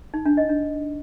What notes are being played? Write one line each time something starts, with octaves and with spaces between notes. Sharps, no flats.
D#4
D4
D#5
D4